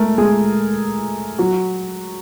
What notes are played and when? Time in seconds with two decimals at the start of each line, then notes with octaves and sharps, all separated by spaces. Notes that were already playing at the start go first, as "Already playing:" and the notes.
Already playing: G#3 A3 A4 A#4
0.18 G#3 G#4
1.39 F#3 F#4